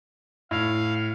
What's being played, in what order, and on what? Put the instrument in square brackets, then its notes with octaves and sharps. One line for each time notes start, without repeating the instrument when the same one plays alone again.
[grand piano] A2 [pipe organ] F5